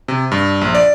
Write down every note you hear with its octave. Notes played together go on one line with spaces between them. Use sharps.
C3
G2
A#1
D5